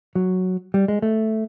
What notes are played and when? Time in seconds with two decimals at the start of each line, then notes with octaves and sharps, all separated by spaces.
0.15 F#3
0.74 G3
0.88 G#3
1.02 A3